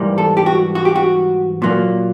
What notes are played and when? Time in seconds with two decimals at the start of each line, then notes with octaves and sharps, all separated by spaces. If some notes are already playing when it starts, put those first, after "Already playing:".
Already playing: G#2 E3 G3 A#3
0.18 A4
0.37 G4
0.46 F#4
0.75 F#4
0.85 G4
0.96 F#4
1.62 A#2 F#3 A#3